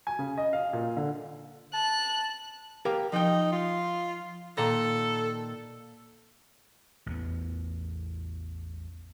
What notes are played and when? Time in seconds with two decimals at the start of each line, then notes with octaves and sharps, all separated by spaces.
0.07 G#5
0.19 C#3
0.38 D#5
0.53 F5
0.73 A#2
0.97 D3
1.73 A5 F#6
2.85 G4 A#4 F5
3.13 F3 D#4 G5
3.52 F4
4.57 A#2 D#3 A4 A#5
7.06 A1 E2 B3